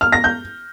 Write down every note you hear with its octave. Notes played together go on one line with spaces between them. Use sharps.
F6
A#6
G6